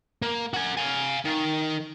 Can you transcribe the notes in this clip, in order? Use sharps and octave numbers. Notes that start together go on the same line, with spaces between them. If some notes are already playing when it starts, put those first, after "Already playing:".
A#3
F#4 G#5
F5 G#5
D#3